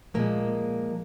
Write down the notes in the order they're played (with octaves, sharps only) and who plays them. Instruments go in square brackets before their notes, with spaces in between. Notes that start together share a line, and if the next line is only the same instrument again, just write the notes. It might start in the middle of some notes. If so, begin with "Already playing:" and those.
[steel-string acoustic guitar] A#2 F3 G#3 A#3